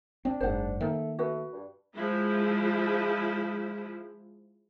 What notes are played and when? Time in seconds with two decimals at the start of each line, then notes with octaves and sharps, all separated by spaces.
0.25 C4 D4
0.40 F#1 G#2 C5 F#5
0.81 D#3 A3 A#3
1.19 A3 F#4 B4
1.52 G2
1.93 F3 G#3 E4